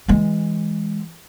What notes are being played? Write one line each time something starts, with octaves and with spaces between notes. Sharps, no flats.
E3 G#3